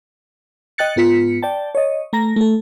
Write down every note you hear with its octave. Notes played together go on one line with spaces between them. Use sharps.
D#5 G5 F#6 A6 C#7
G#2 B3 F4 B6 C#7
D5 G5 A5
C#5 D#5
A3 A#5 A#6
A3 A4